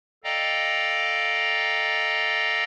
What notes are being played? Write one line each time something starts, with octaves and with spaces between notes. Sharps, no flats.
A4 D5 D#5 F5 G5 A#5